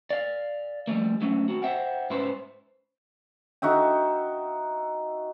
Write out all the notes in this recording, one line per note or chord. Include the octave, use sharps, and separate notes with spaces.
D5 F5
F3 G3 A3 A#3
F#3 G#3 A3 C4 C#4
C4 F#4
C5 E5 F#5 G5
G#2 C#4 E4 B4 C5
D#4 F#4 E5 G5